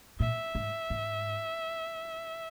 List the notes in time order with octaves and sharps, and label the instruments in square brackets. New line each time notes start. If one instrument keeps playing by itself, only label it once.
[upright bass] A#2 [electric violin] E5
[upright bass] G#2
G#2